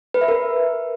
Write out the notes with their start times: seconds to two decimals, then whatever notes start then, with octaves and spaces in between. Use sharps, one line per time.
0.14 B4
0.21 E5
0.28 A#4